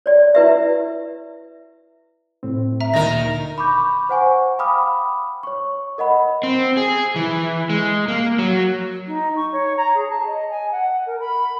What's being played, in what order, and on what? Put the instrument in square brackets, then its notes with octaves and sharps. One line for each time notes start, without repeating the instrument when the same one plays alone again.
[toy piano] C#5 D5
E4 B4 E5
[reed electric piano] A2 C4
[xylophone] E5 A#5
[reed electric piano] D2 A#2 D3 [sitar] D#3 A#4 [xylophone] A#6
[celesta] B5 C#6 D6 G6
C5 F#5 G#5 C#6
F5 G5 B5 D6 D#6 F6
C#5 C#6
A#4 D#5 F#5 B5
[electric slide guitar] C4
G#4
E3
G#3
A#3
F#3
[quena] D#4
C#6
C#5
A#5
G#4
A5
D#5
G#5
F#5
A#4
B5